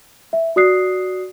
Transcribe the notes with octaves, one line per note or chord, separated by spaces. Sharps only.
E5
F#4 D5 D#6 F#6 C7